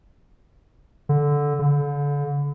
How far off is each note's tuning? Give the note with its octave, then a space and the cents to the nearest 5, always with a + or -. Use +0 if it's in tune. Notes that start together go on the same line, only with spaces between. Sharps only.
D3 -10
D3 -35